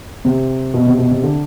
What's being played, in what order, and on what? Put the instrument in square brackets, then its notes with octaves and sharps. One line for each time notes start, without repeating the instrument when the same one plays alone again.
[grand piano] C3
B2
C3
B2
C3
D3